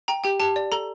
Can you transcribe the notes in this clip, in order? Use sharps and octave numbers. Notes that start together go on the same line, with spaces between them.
G5 A#5
G4 G5
G4 A5
D5
A4 A#5